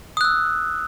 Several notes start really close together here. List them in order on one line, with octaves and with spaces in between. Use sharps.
D#6 F#6 E6